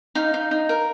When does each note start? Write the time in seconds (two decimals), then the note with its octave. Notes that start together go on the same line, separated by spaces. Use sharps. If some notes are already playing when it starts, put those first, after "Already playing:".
0.15 D#4 F5
0.34 D#4
0.51 D#4
0.69 A#4